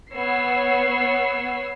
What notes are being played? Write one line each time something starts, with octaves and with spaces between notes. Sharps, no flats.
B3 C#5 E6 C7